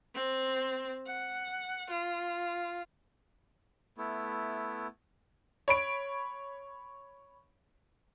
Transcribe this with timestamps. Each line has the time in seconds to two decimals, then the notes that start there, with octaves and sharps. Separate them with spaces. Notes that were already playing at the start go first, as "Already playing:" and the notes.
0.15 C4
1.06 F#5
1.91 F4
3.98 A3 B3 E4
5.68 C#5 B5 D7